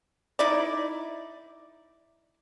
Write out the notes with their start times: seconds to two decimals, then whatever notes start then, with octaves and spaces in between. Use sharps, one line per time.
0.39 D#4 E4 D5